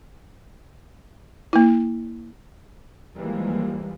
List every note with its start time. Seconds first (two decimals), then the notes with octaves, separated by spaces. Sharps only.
1.53 A#3 E4
3.16 D#2 E3 F3 G3 G#3 A#3